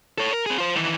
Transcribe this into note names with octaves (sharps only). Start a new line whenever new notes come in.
A4 C#5
A#4
C4 G#4
F4 C5
D#3 E3